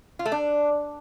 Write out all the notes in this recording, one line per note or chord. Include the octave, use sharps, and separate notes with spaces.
F4
A3
D4